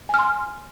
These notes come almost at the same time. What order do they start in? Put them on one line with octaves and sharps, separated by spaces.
G#5 F6 C6